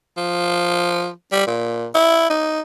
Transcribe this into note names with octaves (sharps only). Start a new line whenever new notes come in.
F3
G3
A#2
E4
D#4